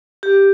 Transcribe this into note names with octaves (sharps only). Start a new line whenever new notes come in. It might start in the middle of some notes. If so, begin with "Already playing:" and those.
G4